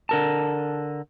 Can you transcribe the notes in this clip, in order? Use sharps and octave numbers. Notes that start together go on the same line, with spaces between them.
D3 A#4 A5